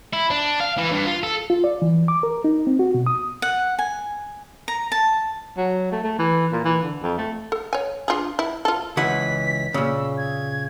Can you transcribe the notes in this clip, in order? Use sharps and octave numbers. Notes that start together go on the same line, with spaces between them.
E4
D4
F5
E3
G2
F4
A4
F4
D5
E3
D6
A#4
D#4
C4
F#4
B2
D#6
F#5
G#5
A#5
A5
F#3
A3
A3
E3
A#2
E3
D3
F2
A3
A4
C#5 G#5
D4 F4 G#4
E4
F4 A4
C#2 E3 F#5 B6
A#2 C#3 E6
G#6